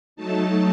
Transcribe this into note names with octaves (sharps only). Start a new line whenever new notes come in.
F#3 A3 D#4 A5